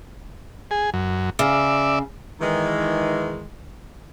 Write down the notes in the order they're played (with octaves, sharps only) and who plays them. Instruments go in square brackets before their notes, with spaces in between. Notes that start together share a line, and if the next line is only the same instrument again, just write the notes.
[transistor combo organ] G#4
F#2
[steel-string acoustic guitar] C#3 [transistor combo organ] D5 E5
[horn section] D#3 E3 G#3